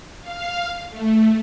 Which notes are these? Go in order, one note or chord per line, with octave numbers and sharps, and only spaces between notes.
F5
A3